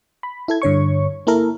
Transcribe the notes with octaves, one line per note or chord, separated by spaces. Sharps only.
B5
E4 A4 G#6
G2 D3 C#5 C#6
A#3 E4 A4 A#4